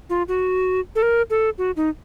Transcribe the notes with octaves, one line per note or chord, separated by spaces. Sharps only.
F4
F#4
A4
A#4
A4
F#4
D#4